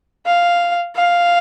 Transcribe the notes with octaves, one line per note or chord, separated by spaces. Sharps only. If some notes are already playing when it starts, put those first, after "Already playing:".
F5
F5